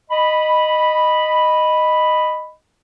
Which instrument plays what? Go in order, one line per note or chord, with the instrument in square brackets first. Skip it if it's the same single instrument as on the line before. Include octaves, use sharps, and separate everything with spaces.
[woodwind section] D#5 B5